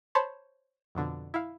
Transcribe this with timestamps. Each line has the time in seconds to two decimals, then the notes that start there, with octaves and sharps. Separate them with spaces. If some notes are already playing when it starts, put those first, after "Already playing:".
0.15 C5 C#5 A5 B5 C6
0.95 F2 B2 D3
1.34 E4 F5